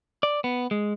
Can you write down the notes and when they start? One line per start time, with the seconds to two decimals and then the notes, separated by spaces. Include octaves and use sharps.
0.23 D5
0.44 B3
0.71 G#3